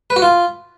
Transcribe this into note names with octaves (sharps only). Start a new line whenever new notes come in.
B4
F#4
F4